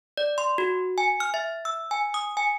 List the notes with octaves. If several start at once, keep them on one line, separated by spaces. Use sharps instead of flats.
D5
C6
F#4
G#5
F6
E5
E6
G#5
D#6
G#5